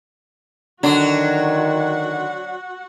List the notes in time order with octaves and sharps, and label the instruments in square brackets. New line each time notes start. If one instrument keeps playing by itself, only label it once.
[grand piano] D3 [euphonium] D#3 [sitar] F#3 D4 [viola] F#4 F#5